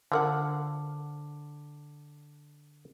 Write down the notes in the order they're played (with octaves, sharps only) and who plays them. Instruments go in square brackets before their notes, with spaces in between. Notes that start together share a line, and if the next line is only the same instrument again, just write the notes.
[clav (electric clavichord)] D3 [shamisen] F3 A#4 F#5